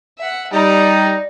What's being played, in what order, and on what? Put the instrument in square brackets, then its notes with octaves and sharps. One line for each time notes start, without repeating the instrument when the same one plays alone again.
[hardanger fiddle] E5 F#5
[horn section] G3 D#4 [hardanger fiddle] D5 A#5